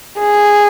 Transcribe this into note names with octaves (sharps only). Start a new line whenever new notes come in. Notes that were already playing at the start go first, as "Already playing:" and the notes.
G#4